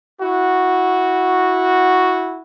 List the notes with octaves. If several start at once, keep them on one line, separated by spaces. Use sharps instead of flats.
E4 F#4